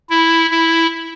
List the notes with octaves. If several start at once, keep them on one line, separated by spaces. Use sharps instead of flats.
E4
E4